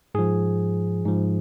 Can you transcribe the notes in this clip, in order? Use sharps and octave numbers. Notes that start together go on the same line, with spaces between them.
G#2 F3 G#4
G#2 F3